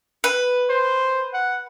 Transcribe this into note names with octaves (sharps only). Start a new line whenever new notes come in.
B4
C5
F#5